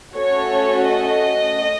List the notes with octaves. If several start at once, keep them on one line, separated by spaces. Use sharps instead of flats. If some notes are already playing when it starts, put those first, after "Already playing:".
A3 C#4 F#4 A4 C#5
D#5